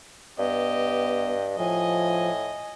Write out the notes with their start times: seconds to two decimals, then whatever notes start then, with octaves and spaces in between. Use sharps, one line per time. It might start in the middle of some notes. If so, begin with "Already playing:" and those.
0.39 G2 B3 G4 D#5
1.58 A2 F3 D#5 G#5